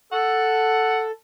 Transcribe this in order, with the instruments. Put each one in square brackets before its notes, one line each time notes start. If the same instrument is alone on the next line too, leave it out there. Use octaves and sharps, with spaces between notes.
[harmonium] A4 [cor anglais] F#5